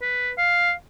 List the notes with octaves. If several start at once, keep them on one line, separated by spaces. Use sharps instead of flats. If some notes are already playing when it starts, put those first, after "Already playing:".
B4
F5